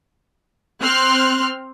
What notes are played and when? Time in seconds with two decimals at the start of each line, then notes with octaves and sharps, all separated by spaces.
0.81 C4 C6 F6 F#6